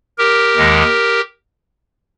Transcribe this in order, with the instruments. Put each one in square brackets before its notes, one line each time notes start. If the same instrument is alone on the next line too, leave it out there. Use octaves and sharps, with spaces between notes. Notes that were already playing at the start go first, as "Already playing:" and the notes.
[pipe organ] G4 A#4
D#2 D#3 G#3